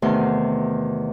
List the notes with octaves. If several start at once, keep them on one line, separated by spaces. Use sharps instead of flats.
E2 C3 D#3 A3 C6